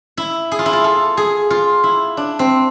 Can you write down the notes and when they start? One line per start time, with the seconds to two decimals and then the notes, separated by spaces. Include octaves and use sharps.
0.17 E4
0.52 G#4
0.59 F4
0.66 E4
0.73 F4
0.84 A4
1.17 G#4
1.50 F4
1.84 E4
2.17 D4
2.39 C4